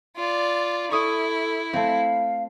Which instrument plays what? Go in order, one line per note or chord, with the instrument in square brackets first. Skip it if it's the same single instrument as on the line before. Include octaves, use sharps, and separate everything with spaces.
[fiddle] F4 D5
[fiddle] E4 [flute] A4 [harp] C#6 D#6
[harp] A3 C4 [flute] F5